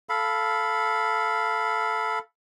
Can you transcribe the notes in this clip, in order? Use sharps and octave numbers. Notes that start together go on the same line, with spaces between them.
A4 F5 B5